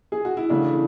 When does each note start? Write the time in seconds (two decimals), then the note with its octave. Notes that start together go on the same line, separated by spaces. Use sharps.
0.12 G#4
0.25 F#4
0.37 E4
0.50 C#3 E3 A3 D4